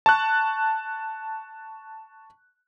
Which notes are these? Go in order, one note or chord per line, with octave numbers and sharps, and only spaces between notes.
A5 C#6 F#6